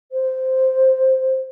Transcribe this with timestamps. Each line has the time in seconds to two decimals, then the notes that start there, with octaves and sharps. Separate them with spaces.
0.11 C5